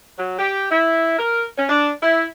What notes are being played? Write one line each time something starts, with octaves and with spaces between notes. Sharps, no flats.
F#3
G4
E4
A#4
C#4
D4
E4